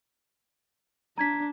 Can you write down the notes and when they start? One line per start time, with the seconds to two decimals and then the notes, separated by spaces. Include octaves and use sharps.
1.18 D4 A#5 G#6 B6